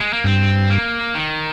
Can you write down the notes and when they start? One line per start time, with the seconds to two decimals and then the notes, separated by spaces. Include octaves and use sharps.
0.01 G#3
0.13 A#3
0.24 G2 C4
0.69 A#3
1.15 D#3